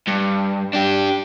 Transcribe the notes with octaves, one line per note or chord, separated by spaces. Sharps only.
G2
D4 G4